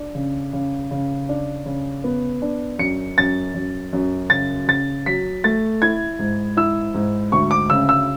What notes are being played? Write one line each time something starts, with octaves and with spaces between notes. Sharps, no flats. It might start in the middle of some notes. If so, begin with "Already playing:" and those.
Already playing: D4
C#3
C#3
C#3
D4
C#3
B3
D4
F#2 C#7
F#2 A6
F#2
F#2
C#3 A6
C#3 A6
F#3 B6
A3 A6
E4 G#6
G#2
E4 E6
G#2
D2 C#6
D6
C#3 E6
E6